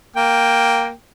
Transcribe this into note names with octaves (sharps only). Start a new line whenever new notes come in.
A#3 G5